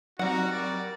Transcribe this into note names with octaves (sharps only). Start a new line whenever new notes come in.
F#3 G3 C4 D#4 F#4 F#5 A#5
A#4 D5